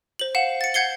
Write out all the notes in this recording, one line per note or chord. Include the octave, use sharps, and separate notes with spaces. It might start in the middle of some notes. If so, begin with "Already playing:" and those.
C5 F#7
F5 F#5 E7
A6 C#7
F#5 G6 G#6 C7 C#7 G7